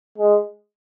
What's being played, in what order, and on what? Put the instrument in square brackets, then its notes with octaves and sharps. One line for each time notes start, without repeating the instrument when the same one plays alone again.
[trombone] G#3